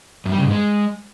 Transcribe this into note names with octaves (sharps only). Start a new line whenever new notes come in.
F#2
G3
C#3
G#2
G#3